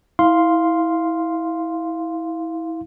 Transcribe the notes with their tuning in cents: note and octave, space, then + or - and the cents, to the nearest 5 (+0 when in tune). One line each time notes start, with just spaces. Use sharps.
E4 -25 F5 +0 C6 +0